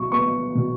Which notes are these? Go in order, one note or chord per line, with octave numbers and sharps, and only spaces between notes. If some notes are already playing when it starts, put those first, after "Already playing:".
Already playing: B2 F#3 C#6
B3 C#6
B2